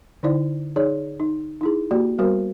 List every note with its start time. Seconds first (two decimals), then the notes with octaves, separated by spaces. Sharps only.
0.23 D3 D#4 E4 C5 D5
0.76 D#4 G#4 C#5 D5
1.20 D#4
1.61 D#4 E4 G#4
1.91 A#3 F#4 G4 D5
2.19 G3 B3 F#4 A#4 C5